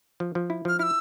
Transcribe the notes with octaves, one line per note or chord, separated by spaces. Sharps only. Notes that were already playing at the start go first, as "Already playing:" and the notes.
F3
F3
E4
F3 F6
E4 E6 F6